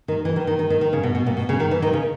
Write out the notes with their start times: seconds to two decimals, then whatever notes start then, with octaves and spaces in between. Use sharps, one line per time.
0.08 D#3
0.25 E3
0.36 D#3
0.47 D#3
0.59 D#3
0.70 D#3
0.81 D#3
0.93 C#3
1.03 B2
1.15 B2
1.26 A#2
1.37 B2
1.49 C#3
1.60 D#3
1.71 E3
1.82 D#3
1.93 C#3